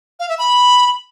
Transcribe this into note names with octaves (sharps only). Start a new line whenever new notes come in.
F5
E5
B5